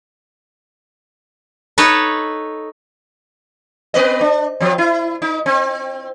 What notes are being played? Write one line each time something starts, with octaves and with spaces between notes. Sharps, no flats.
D#4 A4 B4 C#5
B3 B4 D#5
D4
F3 C4
E4
D#4
C4